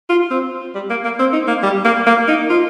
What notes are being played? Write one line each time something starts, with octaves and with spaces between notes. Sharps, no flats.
F4
C4
G3
A#3
A#3
C4
D#4
A#3
G3
A#3
A#3
D#4
F4